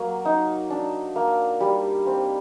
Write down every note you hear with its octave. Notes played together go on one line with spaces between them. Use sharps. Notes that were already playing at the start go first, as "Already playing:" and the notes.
Already playing: F#3 A#3
D#4
D4
A#3
G3
C4